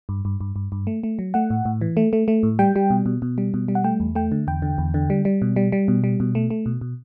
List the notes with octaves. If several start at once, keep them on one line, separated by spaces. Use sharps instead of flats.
G2
G2
G2
G2
G2
A3
A3
F#3
A3 F#5
A2
A2
E3
A3
A3
A3
A2
G3 G5
G3
B2
B2
B2
G3
B2
G3
F#5
A3 G5
E2
A3 G5
D3
E2 G5
D3
E2
D3
G3
G3
B2
G3
G3
B2
G3
B2
A3
A3
B2
B2